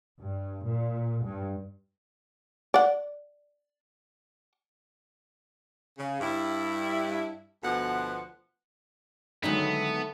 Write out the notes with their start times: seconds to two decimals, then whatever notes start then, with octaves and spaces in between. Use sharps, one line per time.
0.21 G2
0.65 A#2
1.25 G2
2.74 D5 F#5
5.98 C#3
6.21 G2 E4
7.63 D2 B2 F3 B3 F#5
9.43 D3 D#3 F#3 G#3 A3 B3 D#4 C#5